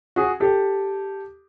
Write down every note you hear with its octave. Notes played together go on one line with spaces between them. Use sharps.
F#4 G#4
G4 A4